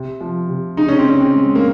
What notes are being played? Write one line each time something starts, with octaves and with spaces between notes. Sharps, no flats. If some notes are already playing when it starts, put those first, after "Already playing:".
Already playing: C3
F3
C3
C#3 D#4
C#4
C4
C#3 C#4
C4
G#3
A#3